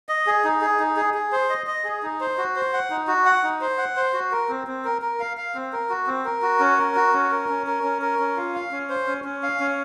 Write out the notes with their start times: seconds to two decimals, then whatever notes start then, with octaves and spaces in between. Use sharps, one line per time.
0.09 D#5
0.27 G#4
0.45 D#4
0.61 G#4
0.80 D#4
0.97 G#4
1.14 G#4
1.32 C5
1.49 D#5
1.67 D#5
1.84 G#4
2.03 D#4
2.20 C5
2.38 F#4
2.56 C5
2.73 F#5
2.90 D#4
3.08 F#4
3.26 F#5
3.43 D#4
3.61 C5
3.78 F#5
3.96 C5
4.13 F#4
4.32 A#4
4.49 C4
4.67 C4
4.85 A#4
5.02 A#4
5.20 F5
5.37 F5
5.55 C4
5.73 A#4
5.90 F#4
6.07 C4
6.25 A#4
6.42 F#4
6.60 C#4
6.77 A#4
6.95 F#4
7.13 C#4
7.31 A#4
7.49 C#4
7.67 A#4
7.84 C#4
8.02 A#4
8.19 C#4
8.37 F4
8.55 F5
8.72 C#4
8.90 C5
9.07 C#4
9.24 C#4
9.43 F5
9.60 C#4